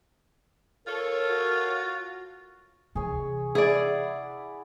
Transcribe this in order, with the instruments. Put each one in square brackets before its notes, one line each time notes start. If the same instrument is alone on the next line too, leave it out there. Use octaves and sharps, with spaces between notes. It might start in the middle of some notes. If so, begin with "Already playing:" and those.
[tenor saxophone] F4 [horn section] A4 C#5 [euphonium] A#4
[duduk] F#4
[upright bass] C3 E3 [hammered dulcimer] G#4 C#5
[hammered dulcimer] E4 F#5 D6 [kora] G#4 D5